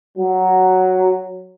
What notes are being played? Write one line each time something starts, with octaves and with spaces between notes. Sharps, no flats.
F#3